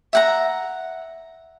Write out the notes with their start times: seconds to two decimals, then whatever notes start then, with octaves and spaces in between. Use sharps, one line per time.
0.13 E5 F#5 A#5